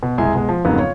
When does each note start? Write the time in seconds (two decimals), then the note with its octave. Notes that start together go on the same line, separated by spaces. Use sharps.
0.03 B2
0.18 F#1 C2 G#3 G#5
0.35 B2 G#3
0.49 F3
0.65 F2 G#2 C#3 F#3 A#3 B3
0.79 F4 C#5